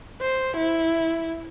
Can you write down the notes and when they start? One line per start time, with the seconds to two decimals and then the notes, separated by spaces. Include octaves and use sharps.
0.21 C5
0.57 E4